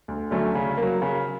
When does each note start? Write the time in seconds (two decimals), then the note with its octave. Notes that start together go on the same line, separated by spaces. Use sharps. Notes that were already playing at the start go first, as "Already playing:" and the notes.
0.08 D2
0.31 D3 F#3 A3 C#4
0.55 C#3
0.77 A#3
0.83 F#3
1.02 C#3